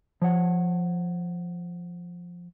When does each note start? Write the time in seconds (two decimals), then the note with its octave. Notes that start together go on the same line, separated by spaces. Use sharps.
0.22 F3 C#5 F#5